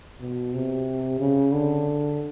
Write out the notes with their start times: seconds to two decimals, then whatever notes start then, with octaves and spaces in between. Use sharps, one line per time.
0.20 B2
0.53 C3
1.19 C#3
1.52 D3